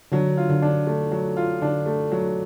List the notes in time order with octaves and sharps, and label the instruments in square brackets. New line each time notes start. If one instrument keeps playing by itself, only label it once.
[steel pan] D3 [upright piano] F#3
[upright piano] F4
[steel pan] D3
[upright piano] D4
A3
F#3
F4
[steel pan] D3 [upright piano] D4
[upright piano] A3
F#3